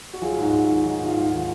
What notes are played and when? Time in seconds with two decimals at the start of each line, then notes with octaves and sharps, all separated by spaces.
0.13 F#4
0.22 F#3 F4 G#4
0.38 G#2
0.43 D#4 F#4
0.53 G#2
0.69 D#3 F4
0.84 F#3 D#4
1.01 G#2 F4
1.16 G#2
1.27 F4
1.32 D#3